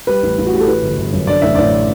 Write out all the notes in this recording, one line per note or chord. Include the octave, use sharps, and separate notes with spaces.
G3 B4
A1
A1
F#4
A2 G4
A4
E3 B4
G1
G1
F#2
D3 D5
A1 E5
A1 D5